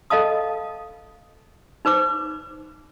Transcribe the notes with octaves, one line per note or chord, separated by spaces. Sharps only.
A4 D#5 F5 A5 D#6
D#4 B4 C5 D6